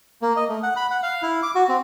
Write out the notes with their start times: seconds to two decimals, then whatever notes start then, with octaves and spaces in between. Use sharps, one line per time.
0.22 A#3
0.36 D#5
0.49 A3
0.63 F#5
0.76 B5
0.90 F#5
1.03 F5
1.22 E4
1.43 D6
1.55 F#4
1.69 C4